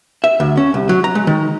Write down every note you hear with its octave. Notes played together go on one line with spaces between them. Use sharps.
E5
D2
C#4
C2
F#3
A#5
G#3
D#3